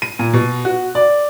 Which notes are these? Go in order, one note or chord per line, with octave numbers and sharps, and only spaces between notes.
D#7
A#2
B2
F#4
D5